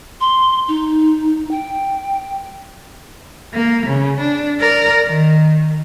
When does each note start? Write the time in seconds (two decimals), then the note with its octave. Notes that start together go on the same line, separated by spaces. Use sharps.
0.21 C6
0.68 D#4
1.51 G5
3.53 A#3
3.86 C#3
4.20 D4
4.60 A#4 D5
5.06 D#3